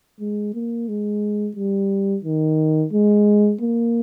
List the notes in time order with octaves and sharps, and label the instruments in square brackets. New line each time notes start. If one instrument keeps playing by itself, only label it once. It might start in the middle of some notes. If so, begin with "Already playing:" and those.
[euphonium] G#3
A#3
G#3
G3
D#3
G#3
A#3